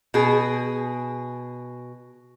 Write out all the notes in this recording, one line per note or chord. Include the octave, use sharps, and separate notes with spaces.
B2 G#4